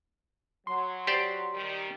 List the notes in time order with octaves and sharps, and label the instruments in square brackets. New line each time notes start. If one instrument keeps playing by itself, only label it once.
[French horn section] F#3 [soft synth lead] C6
[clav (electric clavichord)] G4 C5 D5
[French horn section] D#3 G3